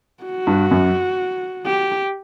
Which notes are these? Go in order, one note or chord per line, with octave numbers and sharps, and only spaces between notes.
F#4
G2
F#2
G4